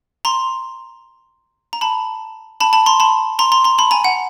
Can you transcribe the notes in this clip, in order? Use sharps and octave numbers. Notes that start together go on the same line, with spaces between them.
A#5 C6
A#5
A5 B5
A5 B5
A5 B5
A#5 C6
A5 B5
A#5 C6
A#5 C6
A#5 C6
A5 B5
G#5 A#5
F#5